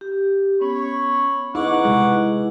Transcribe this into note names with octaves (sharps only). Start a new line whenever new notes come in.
G4
B3 C#4 C#5 B5 C#6
D#4 E4 G#4 B4 F#5 C#6 D6
C3 G#3